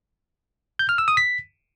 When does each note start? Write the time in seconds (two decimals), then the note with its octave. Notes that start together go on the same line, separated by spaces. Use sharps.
0.79 G6
0.89 F6
0.98 E6
1.08 D#6
1.17 B6